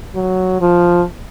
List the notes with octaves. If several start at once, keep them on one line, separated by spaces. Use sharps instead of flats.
F#3
F3